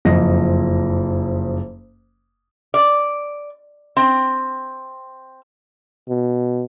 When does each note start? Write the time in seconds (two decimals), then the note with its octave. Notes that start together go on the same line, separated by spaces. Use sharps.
0.05 F#1 F2 F3 D#5 A#6
2.74 D5
3.97 C4
6.09 B2